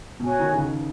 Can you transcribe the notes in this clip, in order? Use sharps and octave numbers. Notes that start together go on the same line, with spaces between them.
B2 F#4 C#5 G#5
D#3
C#3
D#3